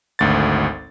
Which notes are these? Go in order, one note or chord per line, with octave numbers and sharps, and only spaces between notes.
G#1 D2 A6